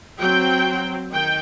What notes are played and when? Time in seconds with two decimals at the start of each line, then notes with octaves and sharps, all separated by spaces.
0.19 F#3 C4 G5
1.11 D#3 G5